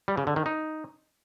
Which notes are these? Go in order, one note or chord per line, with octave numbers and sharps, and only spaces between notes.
G3
C#3
D3
D#3
D#4